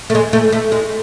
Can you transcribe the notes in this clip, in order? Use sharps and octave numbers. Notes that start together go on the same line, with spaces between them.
A3
G#3
A3
A3
G#3